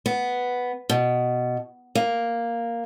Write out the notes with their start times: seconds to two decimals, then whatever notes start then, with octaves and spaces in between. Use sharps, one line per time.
0.06 B3
0.89 B2
1.95 A#3